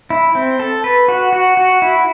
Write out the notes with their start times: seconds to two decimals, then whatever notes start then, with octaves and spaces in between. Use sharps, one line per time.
0.10 E4
0.35 C4
0.59 A4
0.84 B4
1.08 F#4
1.33 F#4
1.57 F#4
1.82 E4